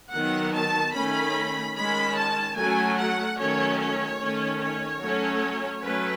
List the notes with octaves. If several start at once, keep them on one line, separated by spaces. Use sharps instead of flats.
D#3 F#3 B3 F#5
A5
D#3 A3 C#4 B5
D#3 G#3 C#4 B5
A5
F#3 A3 C#4 G#5
F#5
D#3 F#3 A3 C#4 C#5
C#5
D#3 A3 C#4
C#5
F#3 A3 C#4
F#3 A3 C#4 B4